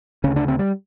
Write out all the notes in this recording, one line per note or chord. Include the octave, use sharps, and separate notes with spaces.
D2 C#3 C#4
D4
C4
G3